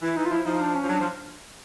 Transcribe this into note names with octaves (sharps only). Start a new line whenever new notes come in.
E3 E4
E3 D#4
F4
F3 E4
F3 D#4
D4
C#4
F3
F#3 D4
F3